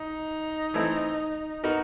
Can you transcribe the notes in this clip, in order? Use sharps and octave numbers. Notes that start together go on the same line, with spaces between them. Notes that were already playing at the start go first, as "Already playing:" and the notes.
Already playing: D#4
E3 A3 C4 E4 A4
B3 D#4 F#4 A#4 D#5